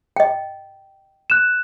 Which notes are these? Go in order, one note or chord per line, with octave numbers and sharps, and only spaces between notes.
D#5 G5
F#6 E7